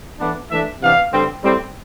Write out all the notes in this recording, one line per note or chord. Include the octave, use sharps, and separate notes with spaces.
A2 E3 B3 D4
E3 A3 D4 E5
C3 E3 B3 D4 F5
G2 D3 G3 C4
A2 G3 C4